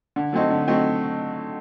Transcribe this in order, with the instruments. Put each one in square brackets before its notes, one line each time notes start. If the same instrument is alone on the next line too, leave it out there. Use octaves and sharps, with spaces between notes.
[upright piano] D3
F#3 A3 C4 D#4
D3
F#3 A3 C4 D#4